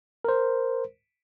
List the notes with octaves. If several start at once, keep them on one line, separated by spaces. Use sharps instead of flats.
A#4 C5